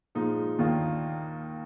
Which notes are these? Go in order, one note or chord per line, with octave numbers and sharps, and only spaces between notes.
A#2 F3 G#3 D#4
D#2 D#3 A#3 D4 F4